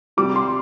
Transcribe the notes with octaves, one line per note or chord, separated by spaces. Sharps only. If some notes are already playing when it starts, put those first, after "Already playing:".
C3 G3 D6
C6